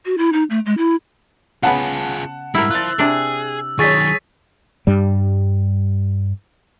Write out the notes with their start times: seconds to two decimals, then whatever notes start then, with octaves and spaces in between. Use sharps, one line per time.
0.05 F#4
0.18 E4
0.33 D#4
0.50 A3
0.66 G#3
0.78 E4
1.63 C#3 B3 F4 G#4 F#5 A5
2.55 G#2 G3 E4 A#4 E6
2.71 F4 C5 F#6 A6
2.99 C3 D4 G#4
3.79 D#3 F#3 G#4 C#5 C#6 A6 B6
4.87 G2 G3